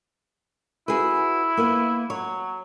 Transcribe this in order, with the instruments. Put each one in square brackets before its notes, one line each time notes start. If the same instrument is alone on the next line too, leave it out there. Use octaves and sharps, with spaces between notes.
[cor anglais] E4 [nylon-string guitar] F#4 G#4 B4
[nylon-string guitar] A#3 B3 B4
[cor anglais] F#3 [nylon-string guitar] C#5